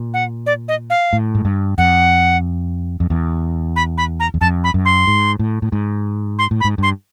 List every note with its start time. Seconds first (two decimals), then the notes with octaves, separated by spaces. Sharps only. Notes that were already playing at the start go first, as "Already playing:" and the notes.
Already playing: A#2
0.14 F#5
0.46 D5
0.68 D#5
0.90 F5
1.13 A2
1.35 G#2
1.45 G2
1.78 F2 F#5
3.00 F2
3.10 E2
3.76 B5
3.98 B5
4.20 A#5
4.34 E2
4.41 F2 A5
4.64 B5
4.74 F#2
4.85 C6
5.07 G#2
5.39 A2
5.62 A2
5.72 G#2
6.39 C6
6.51 A2
6.60 B5
6.64 G#2
6.78 G2 C6